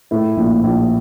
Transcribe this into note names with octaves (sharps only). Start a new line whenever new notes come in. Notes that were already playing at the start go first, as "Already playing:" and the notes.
A2 E4
A#1
A#1